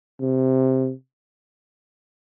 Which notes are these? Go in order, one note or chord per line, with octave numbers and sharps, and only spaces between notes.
C3